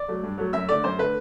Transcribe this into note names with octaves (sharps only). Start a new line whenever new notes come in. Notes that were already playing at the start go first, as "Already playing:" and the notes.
Already playing: D5
F#3 A3
G2
F#3 A3
F#2 E5
D3 A3 D5
F#2 C5
D3 A3 B4